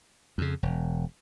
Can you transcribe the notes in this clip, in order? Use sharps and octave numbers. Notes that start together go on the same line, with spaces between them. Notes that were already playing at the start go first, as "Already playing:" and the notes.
F2 C#3
E1